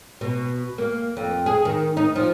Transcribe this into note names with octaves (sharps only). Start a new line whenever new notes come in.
B2
A#3
F2
G#4
D#3
D#4
F3